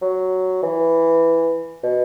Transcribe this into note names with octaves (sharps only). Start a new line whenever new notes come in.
F#3
E3
B2